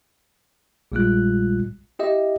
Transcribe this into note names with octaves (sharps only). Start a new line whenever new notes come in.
A#1 A#2 G3 G#3 F4 F#6
E4 G4 D#5 E5